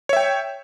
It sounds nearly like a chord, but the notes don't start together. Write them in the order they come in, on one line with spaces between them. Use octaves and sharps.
C#5 E5 G5